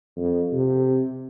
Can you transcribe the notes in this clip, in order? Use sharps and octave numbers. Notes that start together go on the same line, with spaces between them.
F2
C3